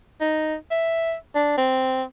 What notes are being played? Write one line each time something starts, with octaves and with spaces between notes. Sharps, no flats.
D#4
E5
D4
C4